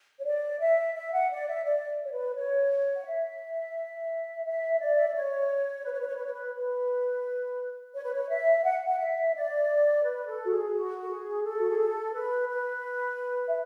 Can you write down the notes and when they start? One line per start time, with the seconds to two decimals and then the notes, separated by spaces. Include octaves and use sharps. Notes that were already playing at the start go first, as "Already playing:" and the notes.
0.19 C#5
0.24 D5
0.59 E5
0.95 E5
1.12 F#5
1.30 D5
1.47 E5
1.64 D5
2.03 C#5
2.12 B4
2.35 C#5
2.95 F#5
3.04 E5
4.45 E5
4.79 D5
4.93 E5
5.04 D5
5.15 C#5
5.84 B4
5.92 C#5
6.01 B4
6.08 C#5
6.17 B4
6.25 C#5
6.33 B4
6.55 B4
7.94 C#5
8.03 B4
8.14 C#5
8.29 E5
8.64 F#5
8.85 F#5
8.98 E5
9.34 D5
10.04 B4
10.27 A4
10.45 F#4
10.50 G#4
10.73 F#4
11.02 A4
11.08 G#4
11.44 A4
11.59 F#4
11.69 G#4
11.79 A4
12.13 B4
12.49 B4
13.48 E5